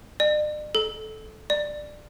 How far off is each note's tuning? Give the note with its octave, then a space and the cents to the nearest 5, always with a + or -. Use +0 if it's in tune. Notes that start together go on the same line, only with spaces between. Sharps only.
D5 +45
A4 -15
D5 +15